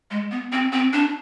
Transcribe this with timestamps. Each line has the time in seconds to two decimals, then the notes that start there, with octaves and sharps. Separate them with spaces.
0.11 G#3
0.31 B3
0.52 C4
0.73 C4
0.93 D4